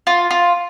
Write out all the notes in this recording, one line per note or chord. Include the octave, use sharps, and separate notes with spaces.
F4
F4